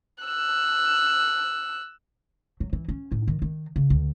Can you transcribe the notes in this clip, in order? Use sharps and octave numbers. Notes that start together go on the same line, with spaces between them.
E6 F#6
F#3
E3
C#4
A2
D#3
D#3
C#3
D2